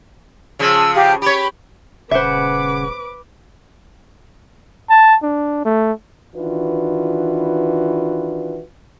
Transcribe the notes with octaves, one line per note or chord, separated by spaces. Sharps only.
C#3 F3 G#4 E6
G4 F5
G4 C#5 B5
D#1 C#3 B4 C5 E5 F#5 D6
A5
D4
A3
D#3 E3 D4 F4 F#4 B4